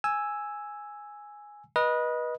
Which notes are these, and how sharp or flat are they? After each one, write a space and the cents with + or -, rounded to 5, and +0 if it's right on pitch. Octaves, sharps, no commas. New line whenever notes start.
G#5 +0 E6 +0
B4 -25 D#5 +0